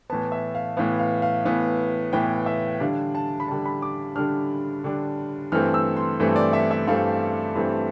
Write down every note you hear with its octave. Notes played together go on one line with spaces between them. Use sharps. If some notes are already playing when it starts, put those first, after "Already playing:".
A2 E3 B3 A5
E5
F5
A2 E3 B3 F5
F5
F5
A2 E3 B3
A2 E3 B3 G5
E5
D3 G3 D4 F5
A5
B5
D3 G3 D4 A5
B5
D6
D3 G3 D4 F6
D3 G3 D4
G2 E3 A3 C4 F6
E6
C6
G2 E3 A3 C4
D5
E5
E5
G2 E3 A3 C4 F5
G2 E3 A3 C4